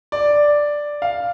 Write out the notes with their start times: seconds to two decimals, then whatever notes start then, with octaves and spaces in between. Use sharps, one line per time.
0.12 D5
1.02 F5